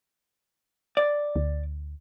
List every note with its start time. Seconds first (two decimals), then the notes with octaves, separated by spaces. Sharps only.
0.97 D5
1.36 D2